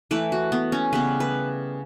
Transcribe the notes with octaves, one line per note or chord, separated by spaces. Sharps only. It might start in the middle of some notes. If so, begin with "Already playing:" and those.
E3 A3 B4
F#4
B3
C#4
C#3 G3 B3 B4
B4